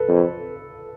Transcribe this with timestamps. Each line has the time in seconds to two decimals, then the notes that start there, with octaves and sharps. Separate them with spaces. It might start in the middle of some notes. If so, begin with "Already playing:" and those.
Already playing: A4 B4
0.08 F2